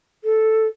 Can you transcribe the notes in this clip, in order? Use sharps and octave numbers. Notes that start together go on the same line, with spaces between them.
A4